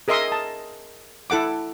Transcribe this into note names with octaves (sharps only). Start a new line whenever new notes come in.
G#4 A#4 D#5 E5 C6 D#6
A5
E4 A4 F#5 D6